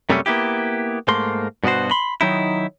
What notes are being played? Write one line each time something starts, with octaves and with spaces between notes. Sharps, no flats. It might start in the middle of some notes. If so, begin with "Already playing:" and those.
F#2 C3 G3 A3 C#4
A#3 B3 E4 G4
G#2 A3 A#3 C6
G2 B2 B3 F#4 C5
B5 C6
D#3 F#3 D#4 E4